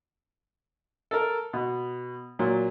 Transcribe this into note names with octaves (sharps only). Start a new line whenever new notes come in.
A4 A#4
B2
A#2 F#3